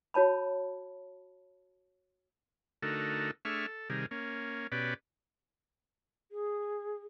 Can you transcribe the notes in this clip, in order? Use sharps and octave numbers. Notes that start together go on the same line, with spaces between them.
F#4 C#5 A5 B5
D3 A3 D#4 F#4 A4 A#4
A3 D4 G#4 E5 C#6 F6
A4
C3 D#3 G3 G#4 A#4
A#3 C#4
B2 C#4 G4 B4 D5
G#4